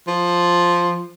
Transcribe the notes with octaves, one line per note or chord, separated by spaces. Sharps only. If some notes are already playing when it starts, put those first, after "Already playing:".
F3